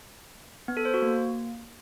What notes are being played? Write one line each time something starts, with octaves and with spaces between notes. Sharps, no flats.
B3
A4
C5
F#4
A#3